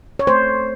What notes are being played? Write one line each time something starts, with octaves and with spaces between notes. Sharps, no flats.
C#5
A3 C5